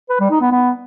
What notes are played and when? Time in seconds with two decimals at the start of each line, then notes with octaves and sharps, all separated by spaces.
0.09 B4
0.20 G3
0.30 D#4
0.41 B3
0.51 B3